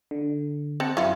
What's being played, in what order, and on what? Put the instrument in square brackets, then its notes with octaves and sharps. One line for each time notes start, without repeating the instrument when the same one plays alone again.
[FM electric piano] D3
[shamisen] C4 [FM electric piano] F#5 A5 C#7
[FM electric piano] F#2 [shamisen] E4 F4